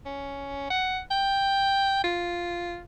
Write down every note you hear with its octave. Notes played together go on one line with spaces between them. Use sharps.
C#4
F#5
G5
F4